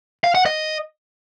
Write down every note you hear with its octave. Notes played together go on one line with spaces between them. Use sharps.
F5
F#5
D#5